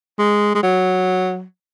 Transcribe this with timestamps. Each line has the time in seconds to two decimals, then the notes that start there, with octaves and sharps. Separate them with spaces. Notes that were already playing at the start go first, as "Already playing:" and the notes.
0.19 G#3
0.55 G#3
0.63 F#3